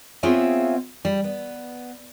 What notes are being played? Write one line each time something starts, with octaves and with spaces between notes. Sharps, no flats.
B3 C4 F4 G#4 C#5 E5
G3
B3